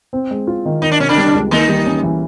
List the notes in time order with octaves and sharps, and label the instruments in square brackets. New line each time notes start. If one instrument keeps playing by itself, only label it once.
[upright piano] C4
G#3
F4
D#3
[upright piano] D#3 [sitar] D#4
[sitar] D4
[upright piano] C3 [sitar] C#4
[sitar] D3 D4
[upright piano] G3
C#2
[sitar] D#3 D#4 [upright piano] A#3
[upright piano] G3
C#4
E3